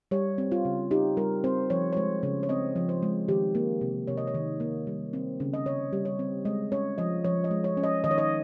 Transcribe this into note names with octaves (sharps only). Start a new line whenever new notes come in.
G3 C#5
C4
F4
C#3
D#4 G4
G3 A#4
C4 C5
F3 C#5
C#5
G#3 C5
C#3 C#5
C#5
C4 D#5
F3
C5
G#3
D#3 G4
A#3
C3
C3 C#5
D#5
C#5
D#3
A#3
G3
C4
C#3
D#5
C#3 C#5
G3
C#5
C4
G#3 D#5
C#4 C#5
F3 D#5
F3 C#5
D#5
G#3
C#5
C#4
D#5
D#3 D#5
C#5
D#5